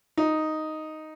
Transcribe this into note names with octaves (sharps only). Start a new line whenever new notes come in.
D#4